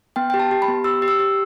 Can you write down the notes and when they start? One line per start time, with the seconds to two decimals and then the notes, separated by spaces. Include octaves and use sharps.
0.16 B3 G5
0.30 G4 G5
0.39 A5
0.51 G4
0.62 B5
0.68 B3
0.84 G4 E6
1.02 G4
1.08 E6
1.19 G4